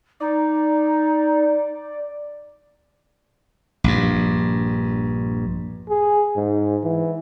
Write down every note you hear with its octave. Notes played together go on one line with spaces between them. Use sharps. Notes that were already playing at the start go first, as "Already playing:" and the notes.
D#4 D5
A#1 G2
G#4
G#2
E3